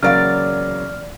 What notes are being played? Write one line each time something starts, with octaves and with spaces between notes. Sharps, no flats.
E2 C#3 F#3 A#3 D5 F5 F6